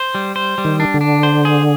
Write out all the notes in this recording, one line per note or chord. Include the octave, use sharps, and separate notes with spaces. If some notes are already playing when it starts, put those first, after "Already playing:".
Already playing: C5
G3
C5
G3
D#3
D4
D3
D4
C5
G#4